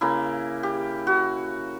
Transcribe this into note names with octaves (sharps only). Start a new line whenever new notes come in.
C#3 A#3 E4
G4
F#4